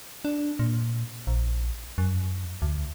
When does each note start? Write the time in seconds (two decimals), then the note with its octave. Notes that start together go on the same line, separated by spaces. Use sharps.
0.25 D4
0.59 A#2
1.27 A#1
1.98 F#2
2.62 D2